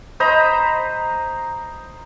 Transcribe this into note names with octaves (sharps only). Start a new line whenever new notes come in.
C5 D#5 A#5 B5